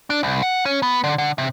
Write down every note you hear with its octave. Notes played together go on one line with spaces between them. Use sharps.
D4
C2
F#5
C#4
B3
D3
D3
C3